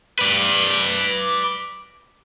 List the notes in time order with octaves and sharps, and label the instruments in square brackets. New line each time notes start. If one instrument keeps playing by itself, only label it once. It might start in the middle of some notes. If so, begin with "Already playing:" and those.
[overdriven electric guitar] B4 D5